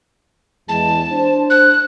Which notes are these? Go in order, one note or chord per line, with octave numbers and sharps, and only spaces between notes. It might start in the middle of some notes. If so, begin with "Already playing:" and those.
E2 G#3 A5
D4 C5
F#6